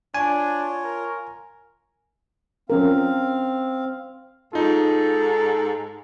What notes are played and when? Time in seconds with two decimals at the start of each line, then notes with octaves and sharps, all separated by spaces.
0.14 D4 F4 C#5 G#5
0.84 A#4
2.70 F3 C4 C#4 A#4 F5
4.53 G#2 D#4 F4 A4